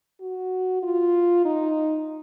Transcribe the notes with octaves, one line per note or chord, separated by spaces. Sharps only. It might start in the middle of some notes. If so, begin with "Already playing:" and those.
F#4
F4
D#4